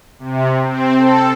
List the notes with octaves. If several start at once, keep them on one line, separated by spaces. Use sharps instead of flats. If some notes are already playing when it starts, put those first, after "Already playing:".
C3
C4
A4